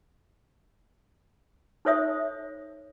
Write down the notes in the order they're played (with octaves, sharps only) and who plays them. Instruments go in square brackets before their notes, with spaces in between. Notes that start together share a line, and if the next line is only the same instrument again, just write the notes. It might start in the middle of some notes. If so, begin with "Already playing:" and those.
[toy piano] D#4 A4 C5 C#5 E5 D#6